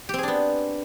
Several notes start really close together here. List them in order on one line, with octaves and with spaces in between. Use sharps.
G4 C4 G#4 D4 B3